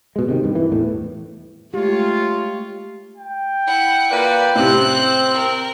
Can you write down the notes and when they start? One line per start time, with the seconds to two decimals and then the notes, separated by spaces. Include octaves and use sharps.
0.16 B2 G#3
0.28 C3 D#3
0.44 G2 D#3
0.55 E3
0.72 E2 A2
1.74 G#3 A3 F4 G4 C#5
3.17 G5
3.67 E4 F#5
4.11 A#3 F4 B4 D5
4.55 A2 C3 C4 F#6
5.33 A#4